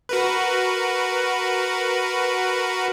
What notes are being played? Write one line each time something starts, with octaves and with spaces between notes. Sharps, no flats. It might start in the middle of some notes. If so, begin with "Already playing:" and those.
F#4 A#4 B4